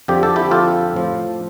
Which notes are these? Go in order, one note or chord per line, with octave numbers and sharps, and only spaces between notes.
F2 D3 F3 G4
A4
E4 G4
F4 A4
A2 F3